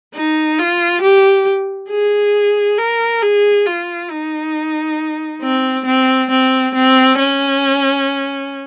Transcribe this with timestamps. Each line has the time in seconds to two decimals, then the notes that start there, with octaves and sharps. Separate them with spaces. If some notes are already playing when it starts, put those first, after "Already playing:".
0.15 D#4
0.58 F4
1.02 G4
1.90 G#4
2.78 A#4
3.22 G#4
3.66 F4
4.10 D#4
5.42 C4
5.86 C4
6.30 C4
6.74 C4
7.19 C#4